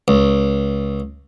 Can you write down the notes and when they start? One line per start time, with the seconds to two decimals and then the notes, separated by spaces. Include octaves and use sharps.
0.08 C#2